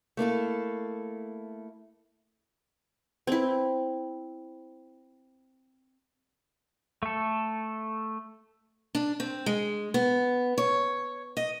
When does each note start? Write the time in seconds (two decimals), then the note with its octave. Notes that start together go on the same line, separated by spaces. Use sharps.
0.17 A3 A#3 E4 A4
3.27 C4 E4
7.03 A3 A4
8.95 D4
9.20 C4
9.46 G#3
9.94 B3
10.58 C#5
11.37 D#5